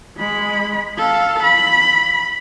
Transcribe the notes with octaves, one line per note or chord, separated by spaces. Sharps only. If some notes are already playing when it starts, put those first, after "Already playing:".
G#3 B5
A4 F5
B5